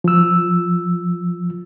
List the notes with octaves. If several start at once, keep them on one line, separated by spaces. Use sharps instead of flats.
F3 E6